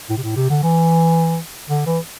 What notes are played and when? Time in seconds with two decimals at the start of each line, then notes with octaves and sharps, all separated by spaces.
0.10 A2
0.17 C3
0.23 A2
0.36 C3
0.50 D3
0.63 E3
1.69 D3
1.86 E3